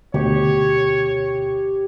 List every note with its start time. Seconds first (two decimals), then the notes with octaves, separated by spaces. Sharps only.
0.14 D2 B2 G4 C#5